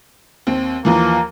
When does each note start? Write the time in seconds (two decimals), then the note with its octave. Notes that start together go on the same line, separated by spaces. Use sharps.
0.47 D#2 C4
0.85 D#2 E3 F3 A#3